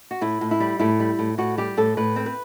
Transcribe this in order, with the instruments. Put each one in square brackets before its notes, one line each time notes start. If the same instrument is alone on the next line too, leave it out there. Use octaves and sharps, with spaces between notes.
[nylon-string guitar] F#4
A2 E4
A2
E4
G3
A2 E4
G3
A2
A2 F#4
G3 G4
A2 A4
A2 B4
C4
B4